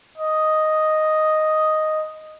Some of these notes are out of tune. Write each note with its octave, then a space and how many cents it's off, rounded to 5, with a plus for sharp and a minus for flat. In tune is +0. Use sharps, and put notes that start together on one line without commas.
D#5 +0